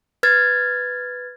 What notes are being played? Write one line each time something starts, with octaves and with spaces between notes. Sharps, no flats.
B4 F6 G#6 A6